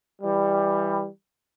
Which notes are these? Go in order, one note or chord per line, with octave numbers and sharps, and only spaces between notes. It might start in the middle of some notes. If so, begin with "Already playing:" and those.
E3 G3